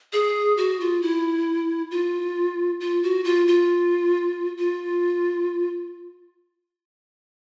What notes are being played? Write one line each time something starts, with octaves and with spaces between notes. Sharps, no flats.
G#4
F#4
F4
E4
F4
F4
F#4
F4
F4
F4